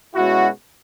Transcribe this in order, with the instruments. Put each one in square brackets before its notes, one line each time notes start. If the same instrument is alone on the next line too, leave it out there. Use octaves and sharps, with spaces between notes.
[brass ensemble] B2 G#3 C#4 E4 F#4